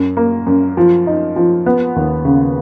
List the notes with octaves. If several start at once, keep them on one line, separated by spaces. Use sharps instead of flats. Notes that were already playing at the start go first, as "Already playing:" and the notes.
Already playing: F#2
A#3
F#2
F3
D#4
F3
B3
D#2
C#3